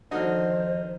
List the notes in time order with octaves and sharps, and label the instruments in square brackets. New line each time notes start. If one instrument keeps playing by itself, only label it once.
[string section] F2 D#3 [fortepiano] D3 D#4 F#4 [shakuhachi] C5 [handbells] D#5 F6